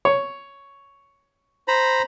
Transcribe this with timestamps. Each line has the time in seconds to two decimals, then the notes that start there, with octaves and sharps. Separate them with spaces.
0.05 C#5
1.68 C5 A#5 B5